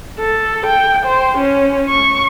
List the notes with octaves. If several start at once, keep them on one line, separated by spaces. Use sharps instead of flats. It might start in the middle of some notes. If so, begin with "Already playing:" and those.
A4
G5
C5
C#4
C#6